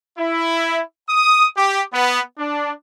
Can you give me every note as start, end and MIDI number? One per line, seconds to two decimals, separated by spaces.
0.19 0.81 64
1.09 1.47 87
1.57 1.82 67
1.93 2.20 59
2.37 2.71 62